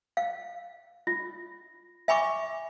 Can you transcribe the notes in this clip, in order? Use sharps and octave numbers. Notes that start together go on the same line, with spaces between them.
F5
F4
E5 G#5 B5 C#6 D6